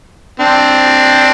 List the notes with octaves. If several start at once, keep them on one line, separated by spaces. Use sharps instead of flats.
C4 D4